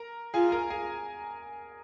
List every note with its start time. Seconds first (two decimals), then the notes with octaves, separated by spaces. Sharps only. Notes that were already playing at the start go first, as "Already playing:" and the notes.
Already playing: A#4 A#5
0.34 F4 G#4 G#5
0.52 A#4 A#5
0.70 G#4 G#5